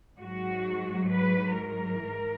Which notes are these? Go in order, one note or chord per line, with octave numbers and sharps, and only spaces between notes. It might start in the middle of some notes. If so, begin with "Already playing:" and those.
G#2 F#3 F#4
B4
A#4
G#2 E3